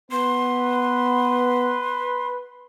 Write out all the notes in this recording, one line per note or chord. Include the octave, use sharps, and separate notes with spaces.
B3 B4 C6